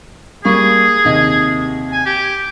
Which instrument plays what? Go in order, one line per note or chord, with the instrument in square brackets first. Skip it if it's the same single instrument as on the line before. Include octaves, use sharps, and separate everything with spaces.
[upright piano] G3 A#3 C#6 [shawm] G#4
[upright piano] D#2 C3 D#5
[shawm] G#5
G4